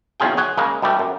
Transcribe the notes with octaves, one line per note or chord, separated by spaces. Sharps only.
B1 E2 C#4 F4 G#4 G5
G#4 C#5 F#5
C#3 G#3 A#3
B2 G3 A3 G4
F#2